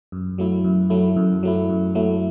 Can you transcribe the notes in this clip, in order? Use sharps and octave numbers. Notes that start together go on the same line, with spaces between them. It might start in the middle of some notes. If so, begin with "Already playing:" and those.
F#2
F#3 A3 E4
F#2
F#3 A3 E4
F#2
F#3 A3 E4
F#2
F#3 A3 E4